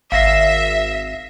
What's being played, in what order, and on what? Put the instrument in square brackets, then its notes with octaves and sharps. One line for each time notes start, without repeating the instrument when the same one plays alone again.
[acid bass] G#1 [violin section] E5 [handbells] F5 A#6 C7